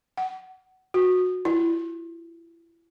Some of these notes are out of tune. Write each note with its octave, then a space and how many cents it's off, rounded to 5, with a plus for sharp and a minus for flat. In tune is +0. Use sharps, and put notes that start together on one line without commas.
F#5 +20
F#4 -20
E4 +25